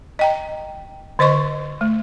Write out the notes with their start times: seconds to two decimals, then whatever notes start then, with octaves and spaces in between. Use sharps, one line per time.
0.19 D#5 G5 A#5
1.19 D3 C5 D#5 C6 C#6
1.81 A3